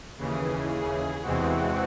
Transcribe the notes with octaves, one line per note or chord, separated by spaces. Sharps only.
D#2 C#3 E3 G#4
G#4
E2 C3 E3 G#3 C4 F#4